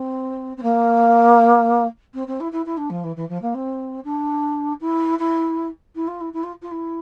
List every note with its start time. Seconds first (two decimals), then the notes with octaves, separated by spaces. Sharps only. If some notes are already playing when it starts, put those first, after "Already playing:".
Already playing: C4
0.57 C4
0.62 A#3
2.14 C4
2.27 C4
2.40 E4
2.52 E4
2.66 E4
2.77 D4
2.90 F3
3.04 E3
3.16 E3
3.29 F3
3.42 A#3
3.54 C4
4.04 D4
4.80 E4
5.19 E4
5.95 E4
6.07 F4
6.20 E4
6.33 E4
6.43 F4
6.62 F4
6.71 E4